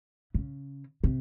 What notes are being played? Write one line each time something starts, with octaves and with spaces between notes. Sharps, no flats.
C#3
C3